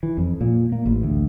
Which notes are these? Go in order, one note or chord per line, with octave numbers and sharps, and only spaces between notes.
E3
F2
A#2
A#3
A1
D2